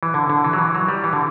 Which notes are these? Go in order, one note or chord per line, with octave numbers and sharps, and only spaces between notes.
E3
D3
D3
E3
F#3
E3
F#3
G3
E3
D3